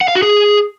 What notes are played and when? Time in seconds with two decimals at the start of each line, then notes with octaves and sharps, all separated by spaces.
0.01 F#5
0.08 F5
0.15 F#4
0.22 G#4